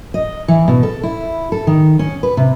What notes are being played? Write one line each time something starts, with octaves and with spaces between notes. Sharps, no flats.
D#5
E3
B2
A4
E4
A4
D#3
C#4
B4
C3